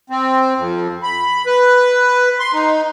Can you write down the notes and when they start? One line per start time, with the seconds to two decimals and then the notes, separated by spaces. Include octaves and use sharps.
0.10 C4
0.57 F2
1.03 B5
1.46 B4
2.40 C6
2.53 D#4